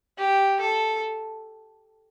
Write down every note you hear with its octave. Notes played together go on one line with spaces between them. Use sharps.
G4
A4